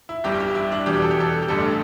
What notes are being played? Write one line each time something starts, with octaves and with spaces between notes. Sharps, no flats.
E4
G1 G2 G3 G4
G4
E4
D4
E2 B2 G3 G4
A4
G4
A4
G4
A1 G2 D3 G3 A4